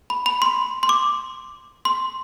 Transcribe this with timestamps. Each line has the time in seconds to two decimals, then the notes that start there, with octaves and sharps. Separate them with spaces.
0.10 B5
0.26 B5
0.42 C6
0.83 C6
0.89 D6
1.85 C6